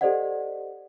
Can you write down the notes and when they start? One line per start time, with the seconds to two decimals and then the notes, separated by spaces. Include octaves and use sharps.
0.01 G4 A4 C5 D5 D#5 F#5